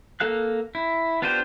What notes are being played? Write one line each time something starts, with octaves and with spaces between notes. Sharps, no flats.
A#3 A4 F5 F#6
E4
B3 D4 F4 G4 C5